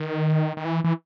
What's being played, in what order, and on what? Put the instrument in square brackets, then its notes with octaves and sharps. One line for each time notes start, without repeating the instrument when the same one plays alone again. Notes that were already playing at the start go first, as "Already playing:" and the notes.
Already playing: [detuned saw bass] D#3
D#3
E3
E3